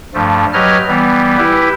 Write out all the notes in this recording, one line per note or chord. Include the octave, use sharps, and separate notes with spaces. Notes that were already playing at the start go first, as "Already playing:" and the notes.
G2 F3 A3
F#3 G4 B4 C#5 D#5 F6
E3 G3 B3
E4 G4 B4